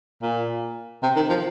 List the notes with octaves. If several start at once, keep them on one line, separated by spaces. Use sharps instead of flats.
A#2
C3
D#3
F3